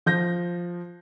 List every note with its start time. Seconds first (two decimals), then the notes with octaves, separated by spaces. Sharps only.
0.06 F3 G6 A#6